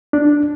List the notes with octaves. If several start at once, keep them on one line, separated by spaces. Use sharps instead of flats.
D4